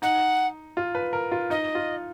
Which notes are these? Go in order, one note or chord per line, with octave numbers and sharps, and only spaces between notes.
D#4 F#5
F4
B4
A#4
F4
D#4 D#5
F4